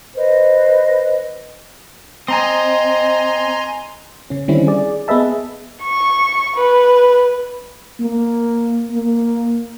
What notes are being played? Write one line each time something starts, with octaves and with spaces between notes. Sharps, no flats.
B4 C5 D#5
C4 D#5 G#5 A#5 C6
C#3 C#4
D3 D#3 G3 C4 C#4 E4
G#4 D5
B3 G#4 B4 D#5 E5 A5
C#6
B4
A#3
A#3